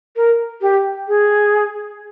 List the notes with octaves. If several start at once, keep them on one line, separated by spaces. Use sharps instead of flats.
A#4
G4
G#4